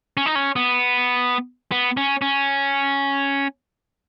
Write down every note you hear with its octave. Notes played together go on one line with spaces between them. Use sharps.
C#4
D#4
C#4
B3
B3
C#4
C#4